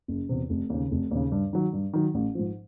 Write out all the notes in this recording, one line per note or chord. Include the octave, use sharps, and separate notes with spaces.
F#1
E2 C3
F1
D#2 C#3
F1
D#2 C#3
G2
D#3 F#3
G2
D#3 F#3
A1
G#2 F3